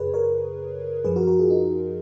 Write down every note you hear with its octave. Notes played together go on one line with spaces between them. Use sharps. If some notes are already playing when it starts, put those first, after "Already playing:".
Already playing: F#2 C#3 G#4 B4 C#5
A#4 C#5
F#2 F3 G#4 B4
F#4 A#4
F#4 A#4
F4 G#4
D#4 F#4